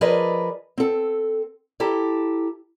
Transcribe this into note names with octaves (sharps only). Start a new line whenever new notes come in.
F3 G#4 A#4 B4 D5 D#5
C4 A4
E4 G4 A4 A#5